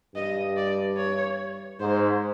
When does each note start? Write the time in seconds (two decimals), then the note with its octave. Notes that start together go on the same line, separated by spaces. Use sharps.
0.15 G2 D#5
0.57 D5
0.97 C#5
1.80 G#2 C5